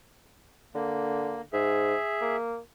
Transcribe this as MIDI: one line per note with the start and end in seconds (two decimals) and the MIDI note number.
0.75 1.42 50
0.75 1.41 58
1.53 1.95 44
1.53 2.36 68
1.53 2.36 76
2.21 2.58 58